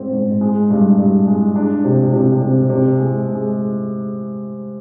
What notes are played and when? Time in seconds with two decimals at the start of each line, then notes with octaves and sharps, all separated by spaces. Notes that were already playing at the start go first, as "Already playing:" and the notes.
Already playing: G#2 C4
0.13 G#2
0.41 G#3
0.70 G2
0.98 G2
1.27 G#3
1.56 D4
1.85 C3
2.13 C3
2.41 C3
2.69 C3
2.98 G#3
3.27 G#3